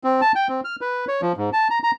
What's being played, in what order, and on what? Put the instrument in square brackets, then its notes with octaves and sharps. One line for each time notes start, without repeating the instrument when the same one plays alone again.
[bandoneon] C4
A5
G5
C4
F6
B4
C#5
F3
G#2
A5
A#5
A#5